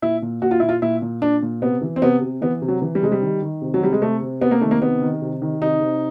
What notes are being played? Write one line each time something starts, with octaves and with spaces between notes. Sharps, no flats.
A#2 E4
A#2
A#2 F#4
F4
A#2 E4
F4
A#2 E4
A#2
A#2 D4
A#2
C3 B3
E3
C4
C3 B3
C3
E3 B3
C3
F#3
E3
G3
C3 G#3
G3
D#3
D#3
C3
F#3
C3 G3
G#3
C3 A3
C3
C3 B3
A#3
D#3 A3
A#3
C3 B3
D#3
C3
D#3
C3 D#4
C3